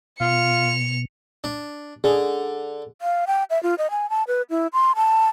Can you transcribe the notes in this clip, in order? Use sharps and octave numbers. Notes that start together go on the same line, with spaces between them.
B2 F4 C#7 F7
D4
D3 G#4
F5
G5
E5
F4
D#5
G#5
A5
B4
E4
C6
A5